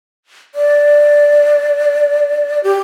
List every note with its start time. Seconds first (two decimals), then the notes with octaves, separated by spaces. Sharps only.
0.55 D5
2.64 G4